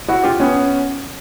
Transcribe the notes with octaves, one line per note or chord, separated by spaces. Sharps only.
E4 F#4
F4 G4
B3 C#4